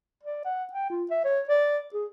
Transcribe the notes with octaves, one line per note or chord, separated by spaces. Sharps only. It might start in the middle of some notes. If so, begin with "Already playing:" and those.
D5
F#5
G5
F4
E5
C#5
D5
G#4